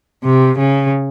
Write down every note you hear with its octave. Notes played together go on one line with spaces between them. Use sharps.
C3
C#3